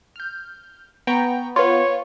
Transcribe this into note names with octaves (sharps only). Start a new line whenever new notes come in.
F6 G6
B3 G5 A#5 C#6
F4 B4 C#5